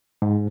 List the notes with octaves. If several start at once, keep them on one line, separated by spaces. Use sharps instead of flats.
G#2